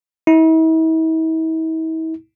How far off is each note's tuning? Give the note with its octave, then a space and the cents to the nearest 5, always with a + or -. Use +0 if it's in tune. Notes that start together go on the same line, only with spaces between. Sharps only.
E4 -45